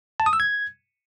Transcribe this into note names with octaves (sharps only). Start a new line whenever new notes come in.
A5
D#6
E6
G#6